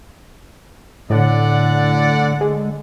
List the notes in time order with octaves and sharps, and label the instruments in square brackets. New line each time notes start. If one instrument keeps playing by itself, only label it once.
[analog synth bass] A2 [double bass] D3 [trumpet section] D5 F#5
[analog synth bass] G#3